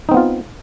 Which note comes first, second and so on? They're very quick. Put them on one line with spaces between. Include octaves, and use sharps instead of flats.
D#4 C4 B3 F4